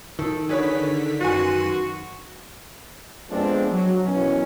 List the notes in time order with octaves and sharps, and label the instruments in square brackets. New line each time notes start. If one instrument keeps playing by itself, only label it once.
[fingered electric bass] D#3 [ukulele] A4
[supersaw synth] D3 B6 [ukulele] G#4 B4 C#5
[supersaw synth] F#2 C6 D#7 [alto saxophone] F#4 [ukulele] B4 G#5
[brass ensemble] F2 F3 G#3 B3 C4 D4
F#3
B2 D#3 E3 F#3 C#4